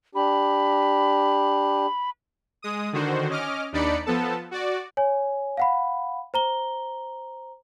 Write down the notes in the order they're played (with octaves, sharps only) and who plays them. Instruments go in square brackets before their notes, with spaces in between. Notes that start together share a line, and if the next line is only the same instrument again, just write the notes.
[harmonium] D4 G4 [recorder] B5
[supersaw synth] G#3 D#6
D3 D#3 F#4 C5
C#4 D#5 D6 F6
D#2 D4 D#4 D5 B5 C#7
F3 B3 A4 A5
F#4 D5
[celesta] C#5 G#5
F5 F#5 B5
C5 A#5 G7